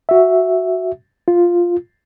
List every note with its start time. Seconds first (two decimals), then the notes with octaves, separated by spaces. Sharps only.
0.09 F#4 E5
1.28 F4